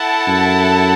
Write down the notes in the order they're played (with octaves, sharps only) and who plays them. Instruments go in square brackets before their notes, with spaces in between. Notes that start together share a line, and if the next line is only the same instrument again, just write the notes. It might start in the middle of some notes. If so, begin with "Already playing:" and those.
Already playing: [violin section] E4 A4 F#5 A5
[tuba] F#2